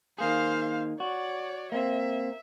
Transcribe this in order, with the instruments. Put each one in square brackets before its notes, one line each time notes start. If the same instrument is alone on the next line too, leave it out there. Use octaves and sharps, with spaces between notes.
[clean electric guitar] D#3 A#3 G#4 [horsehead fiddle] C5 F5
[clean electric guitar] F#4 [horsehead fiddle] C#5 D5
[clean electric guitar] A#3 C4 [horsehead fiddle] E5